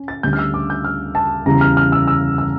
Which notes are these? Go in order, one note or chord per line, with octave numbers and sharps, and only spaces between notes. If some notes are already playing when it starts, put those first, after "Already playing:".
Already playing: C#4
A6
D2 D3 G3 C#4 G6
F6
E6
D6
G6
F6
A5
E2 C#3 G3 C#4 A#5
F6
F6
E6
E6
E6